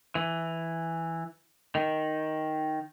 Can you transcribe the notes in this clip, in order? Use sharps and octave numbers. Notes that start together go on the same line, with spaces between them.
E3
D#3